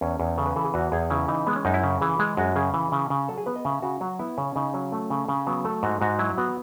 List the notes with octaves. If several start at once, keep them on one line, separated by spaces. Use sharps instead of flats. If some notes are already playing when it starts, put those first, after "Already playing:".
E2 C#4
E2
C#3 A4
B4
E3 A4
G#4
E2 F#4
E2 G#4
C#3 E4
E3 D#4
G#3 B3
C#4
F#2 D#4
E4
C#3
E3 G#4
G#3 G#4
F#2 F#4
C#3 G#4
E3
C#3
C#3
F#3 A4
G#4
B3 B4
D#5
C#3 E5
C#3 F#4
F#3 F#4
B3 E4
C#3 C#4
C#3 D#4
F#3 C#4
A3
C#3
C#3
F#3 B3
A3 A4
G#2 F#4
G#2 F#4
F#3 E4
B3 F#4